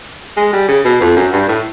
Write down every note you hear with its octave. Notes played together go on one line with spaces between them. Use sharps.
G#3
G3
C#3
B2
F2
F#2
G2
A2